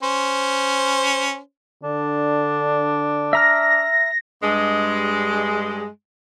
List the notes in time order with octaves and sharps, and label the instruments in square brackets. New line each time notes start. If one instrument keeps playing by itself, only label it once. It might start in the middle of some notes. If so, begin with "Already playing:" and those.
[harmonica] C#4 C5
[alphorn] D3 [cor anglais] D4
[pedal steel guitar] E5 A#5 F6 [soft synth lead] A#6
[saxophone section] G2 G#3